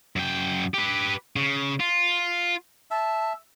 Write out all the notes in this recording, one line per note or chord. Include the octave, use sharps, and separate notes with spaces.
F#2 G5
G4 B4
C#3
F4
E5 A5